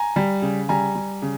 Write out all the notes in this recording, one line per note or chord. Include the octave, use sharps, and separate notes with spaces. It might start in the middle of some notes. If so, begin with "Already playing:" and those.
Already playing: G#5 A#5
G3
C#3
G3 G#5 A#5
G3
C#3